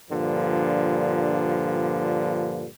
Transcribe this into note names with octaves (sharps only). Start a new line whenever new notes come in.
G2 A#2 D3 F3